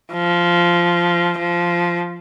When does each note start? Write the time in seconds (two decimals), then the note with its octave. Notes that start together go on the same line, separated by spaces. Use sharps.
0.13 F3
1.39 F3